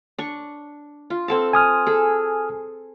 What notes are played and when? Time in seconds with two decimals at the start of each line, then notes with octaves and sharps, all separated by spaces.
0.19 D4 C#6
1.10 F4
1.28 C4 A4 A5
1.53 G#5 D#6 F6
1.86 G#4 A4